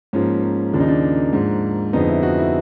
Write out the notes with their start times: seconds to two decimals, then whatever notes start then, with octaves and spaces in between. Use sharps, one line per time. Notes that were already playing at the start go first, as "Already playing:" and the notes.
0.13 G#2 F3 A#3 C#4
0.43 C#4
0.73 D#2 C#3 F3 A#3 D4
0.80 D#4
0.88 D4
1.33 G#2 F3 A#3
1.93 F2 D3 F3 G#3 B3 D#4
2.08 E4
2.23 F#4
2.38 E4